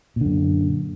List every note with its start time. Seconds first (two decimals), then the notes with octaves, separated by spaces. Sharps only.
0.16 A#2
0.21 D3
0.25 F#2